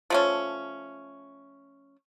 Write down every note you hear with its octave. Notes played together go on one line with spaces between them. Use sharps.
F3 A3 C#4